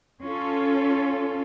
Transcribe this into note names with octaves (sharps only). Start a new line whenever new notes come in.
C#4 F4 A4